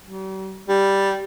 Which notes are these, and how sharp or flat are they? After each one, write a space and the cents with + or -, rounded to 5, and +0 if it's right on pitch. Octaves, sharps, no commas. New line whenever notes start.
G3 -45
G3 +0